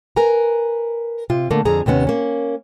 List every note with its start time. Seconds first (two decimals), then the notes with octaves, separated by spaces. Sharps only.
0.16 A#4 B4 G#5 A#5
1.30 C3 F4
1.51 D3 A3 A#3
1.65 F2 D3 G#4 A#5
1.86 D#2 C3 B3 C#4
2.07 A#3 C#4